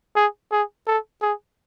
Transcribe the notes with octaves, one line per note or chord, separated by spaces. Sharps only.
G#4
G#4
A4
G#4